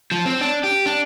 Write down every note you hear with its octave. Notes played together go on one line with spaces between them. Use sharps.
F3
C4
D4
G4
D4